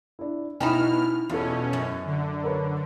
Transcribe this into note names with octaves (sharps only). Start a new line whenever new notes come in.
D4 E4
B2 C#4 D#4 E4 G5 B5 F6
E2 B2 C#4 F4 A4
F#2
D3
A#4 B4 C#5